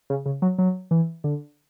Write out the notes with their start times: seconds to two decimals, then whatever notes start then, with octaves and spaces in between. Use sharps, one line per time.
0.10 C#3
0.26 C#3
0.42 F#3
0.58 F#3
0.91 E3
1.24 D3